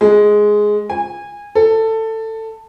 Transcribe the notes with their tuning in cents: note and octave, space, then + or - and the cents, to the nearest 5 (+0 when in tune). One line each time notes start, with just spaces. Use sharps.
G#3 +5
G#5 -20
A4 +15